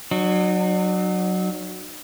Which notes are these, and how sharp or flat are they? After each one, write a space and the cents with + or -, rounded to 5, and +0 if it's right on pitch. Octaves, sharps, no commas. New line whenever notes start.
F#3 +0 D#4 -45